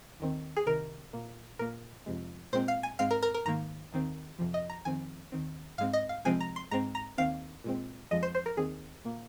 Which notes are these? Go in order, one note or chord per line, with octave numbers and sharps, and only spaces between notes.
D#2 D#3 C4
G#4
C2 C3 D#3 A#4
A#2 A#3
A#2 A#3 A#4
F2 C3 G#3
A#2 G#3 C4 C5
F5
G#5
G#2 G#3 C4 F5
A#4
A#4
A#4
G#2 D#3 A#3 A#5
D#2 D#3 C4
F2 C3 F3
D#5
A#5
F2 D#3 C4 G#5
D#2 D#3 C4
G#2 G#3 C4 F5
D#5
F5
C2 C3 F3 G#3 C4 G#5
A#5
C6
G#2 G#3 C4 A#5
A#5
D#2 D#3 C4 F5
A#2 G#3 C4
F2 F3 G#3 D#5
C5
C5
A#4
D#2 D#3 C4 G#4
A#2 A#3